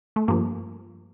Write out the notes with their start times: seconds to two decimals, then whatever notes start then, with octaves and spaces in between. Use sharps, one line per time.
0.16 A3
0.28 G2 F3 A#3